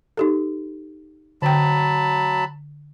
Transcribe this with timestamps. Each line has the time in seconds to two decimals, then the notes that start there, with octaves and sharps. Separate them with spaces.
0.17 D#4 G4 A4
1.42 D3 F#3 G5 A5 B5